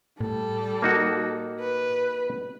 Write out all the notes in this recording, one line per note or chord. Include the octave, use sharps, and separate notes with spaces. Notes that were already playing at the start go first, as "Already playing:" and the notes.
A2 G3 A4
A#3 D#4 F#4
B4